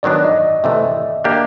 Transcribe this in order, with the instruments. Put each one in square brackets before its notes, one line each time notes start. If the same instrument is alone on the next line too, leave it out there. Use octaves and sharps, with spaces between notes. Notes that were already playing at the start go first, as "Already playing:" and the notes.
[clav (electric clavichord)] D#3 F#3 B3 D4 [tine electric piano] D5
[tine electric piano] D#5
[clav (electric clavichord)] C3 E3 A3 [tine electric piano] E5
[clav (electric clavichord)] A#3 D4 G4